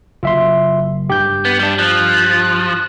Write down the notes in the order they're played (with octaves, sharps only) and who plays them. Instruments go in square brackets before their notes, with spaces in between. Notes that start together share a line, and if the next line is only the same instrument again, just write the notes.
[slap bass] F#1 [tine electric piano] F4 E5 C6
[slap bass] G2 [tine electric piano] G4 G6
[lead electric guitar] B3
G3 D4
[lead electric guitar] F3 [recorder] F#6